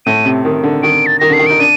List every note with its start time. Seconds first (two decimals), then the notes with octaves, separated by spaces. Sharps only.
0.06 A2 D#7
0.25 C3
0.45 D#3
0.63 D3
0.83 D#3 D7
1.06 A6
1.19 D#3 A#6
1.30 D3 C7
1.39 D#3
1.46 D#4 D7
1.60 D4 D#7